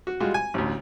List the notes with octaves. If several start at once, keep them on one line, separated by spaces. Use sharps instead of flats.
F#4
G3 G#3 F4 F#4
G#5
A1 D2